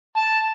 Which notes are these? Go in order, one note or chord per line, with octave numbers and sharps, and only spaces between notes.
A5